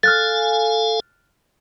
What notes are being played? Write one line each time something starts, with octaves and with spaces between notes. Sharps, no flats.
A4 F5 G#5 F6 F#6 A6